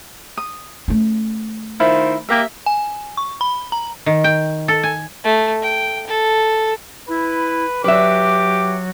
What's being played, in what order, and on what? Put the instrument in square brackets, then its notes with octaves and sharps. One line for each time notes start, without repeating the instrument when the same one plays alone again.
[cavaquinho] D#6
[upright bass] A3 C#4
[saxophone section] D#3 F4 C5 [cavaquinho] E4
[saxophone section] A#3 G4 [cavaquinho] E5
[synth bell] G#5
C#6
B5
A#5
[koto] D#3
G5
A4
G#5
[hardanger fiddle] A3
G5
A4
[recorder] E4 [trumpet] B4
[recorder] F#3 [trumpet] G4 [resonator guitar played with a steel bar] B4 E5 [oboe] D6